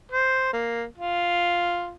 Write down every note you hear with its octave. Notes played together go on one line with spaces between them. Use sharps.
C5
A#3
F4